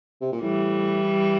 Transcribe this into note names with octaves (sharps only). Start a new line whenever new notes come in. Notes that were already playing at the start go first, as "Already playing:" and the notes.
C3
A#2
A2 E3 G3